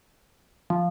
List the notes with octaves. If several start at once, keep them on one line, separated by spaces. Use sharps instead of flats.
F3